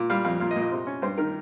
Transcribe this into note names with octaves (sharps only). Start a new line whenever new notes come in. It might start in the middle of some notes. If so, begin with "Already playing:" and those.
Already playing: A#2
G3 F5
F2 F5
A#2 F5
D#5
A#2
D#5
C3
C#4
G2 C5
D#3 A#4